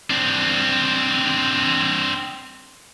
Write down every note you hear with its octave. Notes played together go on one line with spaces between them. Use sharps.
C4 D4